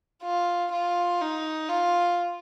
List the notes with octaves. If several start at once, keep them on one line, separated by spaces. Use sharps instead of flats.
F4
F4
D#4
F4